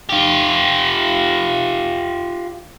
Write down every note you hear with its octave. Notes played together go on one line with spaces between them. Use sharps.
F4 G4